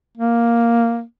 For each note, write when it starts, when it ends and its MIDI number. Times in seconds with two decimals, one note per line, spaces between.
0.18 1.02 58